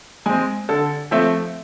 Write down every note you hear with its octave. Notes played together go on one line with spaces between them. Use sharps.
G#3 C4 G#5
D3 A4
F3 A3 C4 E5